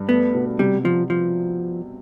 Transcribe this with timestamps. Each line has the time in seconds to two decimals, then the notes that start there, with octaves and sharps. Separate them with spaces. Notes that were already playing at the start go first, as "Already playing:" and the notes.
Already playing: G2
0.09 A3 B3
0.34 B2
0.59 C3 G3
0.84 C3 F3
1.10 F3